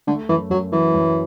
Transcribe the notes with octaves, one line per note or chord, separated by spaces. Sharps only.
D3 A3
F#2 E3
F#2 F#3
E3 F#3
F#2